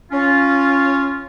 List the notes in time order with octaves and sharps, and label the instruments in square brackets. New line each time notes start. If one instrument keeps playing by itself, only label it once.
[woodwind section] C#4 F4